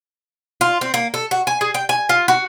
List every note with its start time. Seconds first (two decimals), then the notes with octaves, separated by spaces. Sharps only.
0.61 F4
0.81 C4
0.94 A#3
1.14 A4
1.31 F#4
1.47 G#5
1.61 G#4
1.74 G5
1.89 G#5
2.09 F4
2.28 F#4